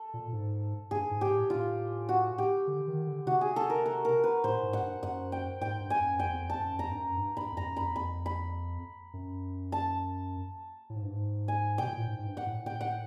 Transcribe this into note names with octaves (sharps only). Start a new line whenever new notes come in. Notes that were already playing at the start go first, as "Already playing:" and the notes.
Already playing: A4
A#2
G#2
G2 G#4
G#2
G4
A2
A2 F4
F#4
G4
D3
D#3
D3
C3 F#4
G#4
A4
A#4
A4
A#4
B4
A2 C5
G#2
F#5
G2
F#2 F#5
G5
G#2 G5
G2
G#5
F#2
F2 G5
E2
F2
A5
F#2
F2 A#5
G2
F#2
G2
G2 B5
F2
A#5
F#2
F2 B5
F2 B5
B5
F#2
A5
A2
G#2
G2
G#2
G#5
B2 G5
A#2
A2
G#2
G#2
G2
F#5
A2
A2 G5
F#5